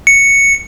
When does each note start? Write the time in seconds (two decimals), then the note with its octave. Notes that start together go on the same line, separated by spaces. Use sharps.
0.07 C#7